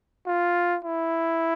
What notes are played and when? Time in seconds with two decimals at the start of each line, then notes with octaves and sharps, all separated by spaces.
0.26 F4
0.84 E4